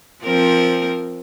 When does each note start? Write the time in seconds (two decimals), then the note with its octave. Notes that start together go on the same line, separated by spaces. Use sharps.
0.24 F3 C4 A#4